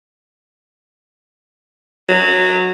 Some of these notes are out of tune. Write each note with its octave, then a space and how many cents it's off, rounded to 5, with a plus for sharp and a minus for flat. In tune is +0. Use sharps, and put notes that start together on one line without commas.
F#3 -10